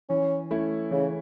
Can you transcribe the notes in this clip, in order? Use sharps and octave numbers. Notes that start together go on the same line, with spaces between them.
E3 C#4
A3 C#4 E4
C#3 E3